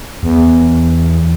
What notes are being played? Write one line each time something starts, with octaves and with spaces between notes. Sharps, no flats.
E2